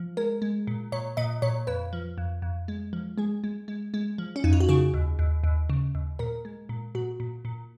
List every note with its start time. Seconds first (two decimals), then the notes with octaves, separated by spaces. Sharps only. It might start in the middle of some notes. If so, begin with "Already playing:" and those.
Already playing: F3
0.17 G#3 A#4
0.42 G#3
0.67 A#2
0.92 A#2 C#5
1.17 A#2 D#5
1.42 A#2 C#5
1.67 F2 B4
1.93 F3
2.18 F2
2.42 F2
2.68 G#3
2.93 F3
3.18 G#3 G#4
3.44 G#3
3.68 G#3
3.94 G#3
4.18 F3
4.36 C#4
4.44 F2 D#4
4.53 F4
4.60 F#4
4.69 C#3 G#4
4.94 D#2
5.19 D#2
5.44 D#2
5.70 C#3
5.95 D#2
6.19 A#2 A#4
6.45 G#3
6.69 A#2
6.95 A#2 F#4
7.20 A#2
7.45 A#2